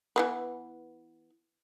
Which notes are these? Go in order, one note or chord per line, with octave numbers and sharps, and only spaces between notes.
E3 A3 B3